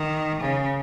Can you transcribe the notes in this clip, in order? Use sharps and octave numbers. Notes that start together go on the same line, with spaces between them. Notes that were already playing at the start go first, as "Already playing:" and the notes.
Already playing: D#3
C#3